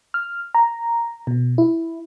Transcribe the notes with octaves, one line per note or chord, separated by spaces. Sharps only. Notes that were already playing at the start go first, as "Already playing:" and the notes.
F6
A#5
B2
E4